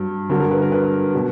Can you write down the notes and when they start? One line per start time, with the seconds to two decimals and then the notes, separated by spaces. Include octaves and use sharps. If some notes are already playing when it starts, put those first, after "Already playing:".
Already playing: G2 F#3
0.30 G2 D3 F#3 A#4
0.40 A#4
0.51 B4
0.62 A#4
0.72 B4
1.14 B2 F#3